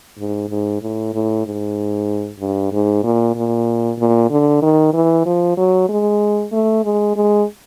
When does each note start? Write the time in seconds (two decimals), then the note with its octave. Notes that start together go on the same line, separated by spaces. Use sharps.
0.19 G#2
0.50 G#2
0.82 A2
1.14 A2
1.46 G#2
2.40 G2
2.72 G#2
3.03 A#2
3.36 A#2
3.99 A#2
4.30 D3
4.62 D#3
4.94 E3
5.26 F3
5.57 F#3
5.89 G#3
6.52 A3
6.84 G#3
7.16 G#3